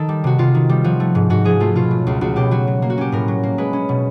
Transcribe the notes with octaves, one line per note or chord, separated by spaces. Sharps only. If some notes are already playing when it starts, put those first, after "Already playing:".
Already playing: D#3 A4
G3
C3 F#4
C3 F4
D#3
G3
F3 F#4
A3
G#2
G#2 F#4
F3 G#4
A3 F4
B2 F4
F#3
C#2
C#2 F#4
B2 G4
F#3 F#4
F#3
A#3
F#4
C#4 G4
A2 A#4
F#3
A#3
G#3 B4
C#4
B2